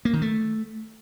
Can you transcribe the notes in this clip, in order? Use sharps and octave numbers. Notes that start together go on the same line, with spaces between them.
A#3
D#3
A3